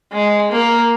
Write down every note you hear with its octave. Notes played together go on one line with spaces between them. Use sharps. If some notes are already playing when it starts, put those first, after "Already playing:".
G#3
A#3